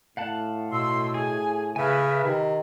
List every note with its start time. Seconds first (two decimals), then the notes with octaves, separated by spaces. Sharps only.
0.17 A2 F5 F#5 A5
0.72 B2 C6 E6
1.14 G#4 G#5
1.76 C#3 B4 E5 G#5 F6
2.24 C3 D#3